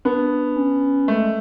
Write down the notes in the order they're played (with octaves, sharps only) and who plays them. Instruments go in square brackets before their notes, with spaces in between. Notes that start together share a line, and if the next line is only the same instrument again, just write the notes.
[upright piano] B3 [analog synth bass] D4
[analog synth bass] C#4
[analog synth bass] G#3 [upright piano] A3